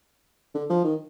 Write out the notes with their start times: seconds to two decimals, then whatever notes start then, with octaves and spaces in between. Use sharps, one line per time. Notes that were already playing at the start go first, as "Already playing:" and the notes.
0.54 D3
0.69 F3
0.84 D#3